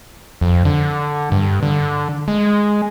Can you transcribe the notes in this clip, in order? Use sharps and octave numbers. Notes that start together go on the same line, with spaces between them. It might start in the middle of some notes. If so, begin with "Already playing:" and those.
F2
D3
G2
D3
G#3